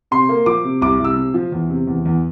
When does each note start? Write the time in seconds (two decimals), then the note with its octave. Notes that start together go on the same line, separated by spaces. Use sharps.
0.11 C3 C6
0.29 A#3
0.46 F3 D6
0.64 C3
0.81 C2 D6
0.99 C2
1.04 E6
1.16 C3
1.34 F3
1.52 E2
1.69 C3
1.87 E2
2.05 E2